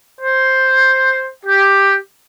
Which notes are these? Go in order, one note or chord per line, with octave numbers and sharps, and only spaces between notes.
C5
G4